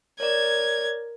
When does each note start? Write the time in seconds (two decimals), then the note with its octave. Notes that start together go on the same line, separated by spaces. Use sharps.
0.20 A#4 C#5 D5 G#6